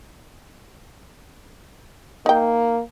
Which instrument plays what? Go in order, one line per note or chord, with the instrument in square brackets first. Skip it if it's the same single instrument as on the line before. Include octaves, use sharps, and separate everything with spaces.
[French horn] A#3 [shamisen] D#4 G5